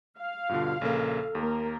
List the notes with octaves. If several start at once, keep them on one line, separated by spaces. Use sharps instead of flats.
F5
G2 B2 D3 F4
A#1 C#3 A#3 A4
D#2 A#3 A#4